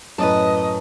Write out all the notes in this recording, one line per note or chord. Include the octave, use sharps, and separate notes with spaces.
F#2 A2 B4 D#5 A5